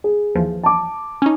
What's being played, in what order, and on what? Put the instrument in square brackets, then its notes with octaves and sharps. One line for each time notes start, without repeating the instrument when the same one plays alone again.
[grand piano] G#4
[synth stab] D#2 E3 F3
[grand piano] A5 D6
[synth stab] C#4 D#4